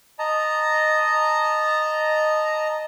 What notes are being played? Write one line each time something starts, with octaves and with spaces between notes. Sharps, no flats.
D#5 A5 A#5